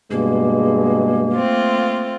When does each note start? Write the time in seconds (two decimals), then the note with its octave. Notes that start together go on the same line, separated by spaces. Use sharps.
0.11 G2 B2 G#3 A#3
1.34 A3 C4 F4